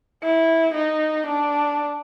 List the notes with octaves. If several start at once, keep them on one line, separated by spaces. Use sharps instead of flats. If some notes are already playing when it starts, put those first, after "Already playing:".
E4
D#4
D4